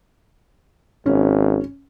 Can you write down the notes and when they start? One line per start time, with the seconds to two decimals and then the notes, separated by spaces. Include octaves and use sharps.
1.06 G#1 C#4